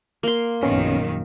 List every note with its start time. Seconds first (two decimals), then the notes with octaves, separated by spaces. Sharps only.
0.23 A#3 C6
0.63 A#1 F#2 D#3 B3 C#4